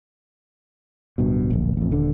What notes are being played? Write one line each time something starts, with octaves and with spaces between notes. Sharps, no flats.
D1 G2 B2
D1 A#1
A1 F2
D#1 D3